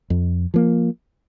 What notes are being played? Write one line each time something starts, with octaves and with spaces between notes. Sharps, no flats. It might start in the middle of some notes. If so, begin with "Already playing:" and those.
F2
F3 A#3